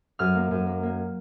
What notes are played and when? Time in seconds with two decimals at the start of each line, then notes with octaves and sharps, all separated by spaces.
0.19 F#2 F6
0.35 A#3
0.51 F#2
0.66 A#3
0.83 A#3